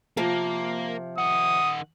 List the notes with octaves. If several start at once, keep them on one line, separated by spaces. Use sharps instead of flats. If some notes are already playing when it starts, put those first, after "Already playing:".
C3 F3 A#3
D#3 F#5 D#6